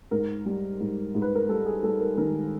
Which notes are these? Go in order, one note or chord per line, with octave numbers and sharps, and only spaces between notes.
G#2 A#4
G3
G#2
G#2
B4
A#4
G3 A4
G#4
G3 A4
A#4
D#3 A#4